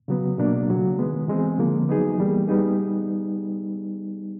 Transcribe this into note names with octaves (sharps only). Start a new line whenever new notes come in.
C#3 F#3 B3
B2 F#3 A#3 D4
C#3 F#3 A3
D#3 G#3 B3
E3 G#3 C4
D3 F3 A#3
F#3 B3 D#4 G#4
E3 G3 A#3
G3 B3 D#4 G#4